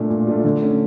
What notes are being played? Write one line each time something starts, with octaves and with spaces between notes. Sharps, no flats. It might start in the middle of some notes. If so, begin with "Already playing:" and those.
Already playing: A#2 A3 D4 F4
A#2
A3 D4 F4
D3
A3 C#4